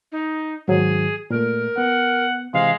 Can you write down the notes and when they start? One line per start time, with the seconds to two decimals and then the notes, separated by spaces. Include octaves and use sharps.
0.12 D#4
0.68 G#2 D#3 F#3 G#4
1.30 A#2 A3 A#4
1.78 B3 F#5
2.54 C3 E3 G#3 F5